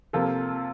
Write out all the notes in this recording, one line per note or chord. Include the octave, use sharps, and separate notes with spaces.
C3 F3 A#3 F4 A4